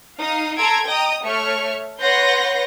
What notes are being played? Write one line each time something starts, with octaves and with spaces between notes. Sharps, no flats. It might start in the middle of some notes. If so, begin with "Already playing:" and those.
D#4 F5 D#6
A4 A#5 C6 E6 G#6 D7
D#5 G5 A#5 D#6
A3 C#5 E5 C#6 F6
B4 C#5 F#5 C6 G6 A#6